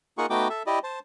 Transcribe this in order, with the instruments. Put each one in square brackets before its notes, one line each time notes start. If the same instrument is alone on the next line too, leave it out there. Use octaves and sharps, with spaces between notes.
[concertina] A#3 D#4 F4 G#4 F#5 C#6
A3 B3 D#4 F#4 G5 D6
A4 E5
E4 G4 D5 D#5
C5 A5